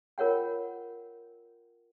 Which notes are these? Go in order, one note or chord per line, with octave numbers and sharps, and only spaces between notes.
F4 A#4 C#5 F#5 G5